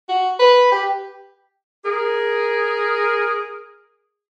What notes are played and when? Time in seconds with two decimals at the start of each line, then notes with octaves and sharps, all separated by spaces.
0.09 F#4
0.40 B4
0.72 G4
1.84 G#4 A#4